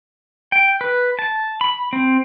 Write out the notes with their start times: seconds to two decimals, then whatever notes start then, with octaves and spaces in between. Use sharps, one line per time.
0.52 G5
0.81 B4
1.19 A5
1.61 B5
1.93 C4